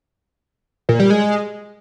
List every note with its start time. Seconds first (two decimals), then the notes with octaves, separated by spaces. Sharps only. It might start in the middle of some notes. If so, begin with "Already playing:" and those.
0.89 A#2
1.00 G3
1.10 G#3